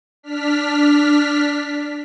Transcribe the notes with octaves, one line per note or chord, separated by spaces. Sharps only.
D4 F6 B6